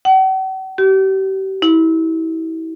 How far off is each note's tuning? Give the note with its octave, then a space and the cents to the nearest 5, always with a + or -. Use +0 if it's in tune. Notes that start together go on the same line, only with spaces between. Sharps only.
F#5 +45
G4 -35
E4 -30